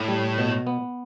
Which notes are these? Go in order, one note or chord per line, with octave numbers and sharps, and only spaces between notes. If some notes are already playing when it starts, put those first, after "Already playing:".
Already playing: A2
G3
B2
B3